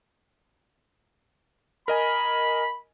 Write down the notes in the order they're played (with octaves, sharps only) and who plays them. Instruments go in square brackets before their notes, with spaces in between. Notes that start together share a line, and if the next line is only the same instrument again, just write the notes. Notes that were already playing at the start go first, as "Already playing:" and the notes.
[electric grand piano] A#4 D#5 G#5 [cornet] B5